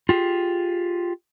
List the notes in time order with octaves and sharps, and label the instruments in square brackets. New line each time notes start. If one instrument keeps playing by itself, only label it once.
[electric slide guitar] F4 G4 G#4